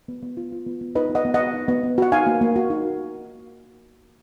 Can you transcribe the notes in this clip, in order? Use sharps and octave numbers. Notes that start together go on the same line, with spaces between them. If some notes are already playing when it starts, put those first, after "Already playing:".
B3
B3
F4
F4
B3
B3
D#4 B4 D#5
B3
D#5 F#5
B3
D#5 F#5
F#4
D#4
B3
B3
F#4 F#5
D#4 F5 G#5
A#3
A#3
F#4
D#4